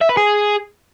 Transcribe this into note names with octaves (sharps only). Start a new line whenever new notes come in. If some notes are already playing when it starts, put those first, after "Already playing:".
E5
B4
G#4